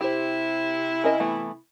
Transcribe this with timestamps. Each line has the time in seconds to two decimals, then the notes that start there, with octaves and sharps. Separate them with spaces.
0.01 C3 E4 G4 C5
1.04 C#4 A#4 D#5
1.20 E3 A3 B3